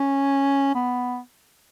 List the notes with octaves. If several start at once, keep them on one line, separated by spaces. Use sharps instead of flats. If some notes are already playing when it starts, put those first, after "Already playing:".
Already playing: C#4
B3